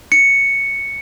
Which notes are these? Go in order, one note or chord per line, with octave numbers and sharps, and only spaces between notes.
C#7